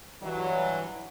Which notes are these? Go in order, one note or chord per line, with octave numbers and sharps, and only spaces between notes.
G2 E3 F#3